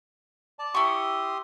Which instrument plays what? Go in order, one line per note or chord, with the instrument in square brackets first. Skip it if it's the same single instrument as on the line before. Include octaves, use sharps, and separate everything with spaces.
[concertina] D5 A5
[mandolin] E4 C#6 [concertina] G4 C6 D#6